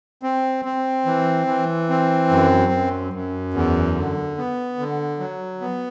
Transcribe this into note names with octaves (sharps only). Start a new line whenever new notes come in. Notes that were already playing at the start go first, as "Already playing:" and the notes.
C4
C4
E3
E3
C4
F#2
F#2
F#2
E2
D3
B3
D3
F#3
B3